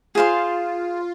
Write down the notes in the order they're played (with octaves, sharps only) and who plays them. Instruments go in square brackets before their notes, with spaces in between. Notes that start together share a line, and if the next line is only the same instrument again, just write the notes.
[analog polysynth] F4 [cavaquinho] G#4 C5 F5 C6